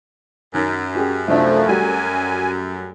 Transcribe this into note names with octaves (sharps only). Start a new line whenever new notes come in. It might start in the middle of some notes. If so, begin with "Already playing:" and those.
F#2 D#3
C#4 G4 G#4
C2 F3 A3 D4 E5
G3 A3 F#4 G#5